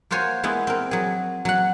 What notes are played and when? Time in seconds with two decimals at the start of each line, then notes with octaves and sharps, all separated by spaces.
0.11 A#3 F4 F#4 C5 C#5 G#5
0.43 G#3 B3 E4
0.67 C4 A#4
0.91 F#3 G#4
1.45 F#3 F#5